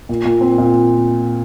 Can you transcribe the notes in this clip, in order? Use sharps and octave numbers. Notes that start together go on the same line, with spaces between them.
A#2
A#2
C4
A#2